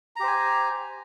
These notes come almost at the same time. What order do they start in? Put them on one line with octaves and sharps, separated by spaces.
A#5 G4 C5 G#5